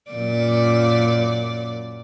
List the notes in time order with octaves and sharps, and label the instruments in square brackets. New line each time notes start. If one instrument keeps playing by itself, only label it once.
[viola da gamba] F#2 A#2 D5